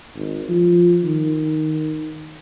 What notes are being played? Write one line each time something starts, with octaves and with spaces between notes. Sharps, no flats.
G#1
F3
D#3